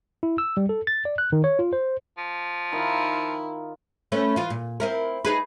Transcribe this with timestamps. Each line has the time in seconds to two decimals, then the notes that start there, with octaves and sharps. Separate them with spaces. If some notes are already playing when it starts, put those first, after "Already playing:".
0.23 E4
0.38 E6
0.57 G3
0.69 A4
0.87 A6
1.05 D5
1.18 F#6
1.32 D#3
1.44 C#5
1.59 F4
1.73 C5
2.18 F3
2.72 D#3 E4 F4
4.12 A3 C#4 B4
4.36 E3 F4
4.50 A#2
4.80 C4 E4 A#4
5.25 D#4 G#4 B4